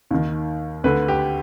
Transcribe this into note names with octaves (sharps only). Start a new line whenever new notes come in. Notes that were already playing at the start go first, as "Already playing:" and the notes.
D#2 D#3
D2 D3 B4
G4